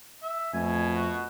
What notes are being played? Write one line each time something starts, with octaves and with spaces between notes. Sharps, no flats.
E5
F2 B2 A3 G#5
F#4